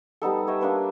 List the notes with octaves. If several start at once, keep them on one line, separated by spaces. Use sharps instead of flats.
G3 B3 D#4 A4
C#5 D#5 E5 G5
A#3 D4 B4